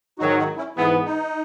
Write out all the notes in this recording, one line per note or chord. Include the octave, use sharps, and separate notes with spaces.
G#2 D#3 F#3 D#4 F#4
D#4 F#4
C#4 E4
G#2 E3 B3 E4 G#4
D#4